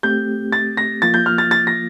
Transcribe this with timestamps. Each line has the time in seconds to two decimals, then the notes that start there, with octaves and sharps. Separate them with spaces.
0.03 A3 C4 G4 G6
0.52 A6
0.77 A#6
1.02 F3 A#3 F4 A6
1.14 G6
1.26 F6
1.38 A6
1.51 A6
1.67 A#6